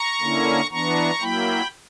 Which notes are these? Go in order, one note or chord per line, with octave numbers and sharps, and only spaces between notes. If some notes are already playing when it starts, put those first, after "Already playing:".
Already playing: A#5 C#6
D3 A#3 C#4 E4
E3 B3 D4 A#5 C#6
F#3 A#3 E4 G5 B5